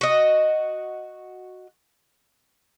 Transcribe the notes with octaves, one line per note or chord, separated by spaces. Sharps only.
F#4 D#5